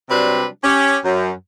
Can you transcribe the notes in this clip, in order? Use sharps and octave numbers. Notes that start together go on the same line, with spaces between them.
C3 F#3 G3 C4 D4 B4
C#4 G4
F#2